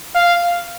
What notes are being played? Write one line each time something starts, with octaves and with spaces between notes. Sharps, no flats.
F5